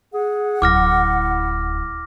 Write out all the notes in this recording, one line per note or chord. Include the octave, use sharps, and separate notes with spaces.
G#4 F#5
D1 E4 D6 F6 A#6